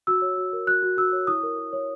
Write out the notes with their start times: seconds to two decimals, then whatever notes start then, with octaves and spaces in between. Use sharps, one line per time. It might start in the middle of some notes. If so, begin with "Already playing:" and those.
0.07 F#4 E6
0.22 C#5
0.38 F#4
0.53 A#4
0.67 F#4 F#6
0.82 F#4
0.97 F#4 E6
1.13 C#5
1.27 E4 D#6
1.43 A#4
1.58 A#4
1.73 C#5